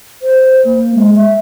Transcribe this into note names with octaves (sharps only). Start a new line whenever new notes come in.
C5
A#3
G#3
E5